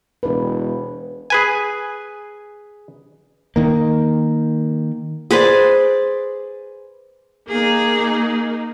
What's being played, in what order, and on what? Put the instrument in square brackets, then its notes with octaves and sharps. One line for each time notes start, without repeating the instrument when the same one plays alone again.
[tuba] E1 [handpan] D4 B4
[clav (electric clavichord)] G#4 B4 G#5
[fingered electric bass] D#3 A#3
[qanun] G#4 B4 C5 D5
[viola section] A#3 D#4 [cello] G#4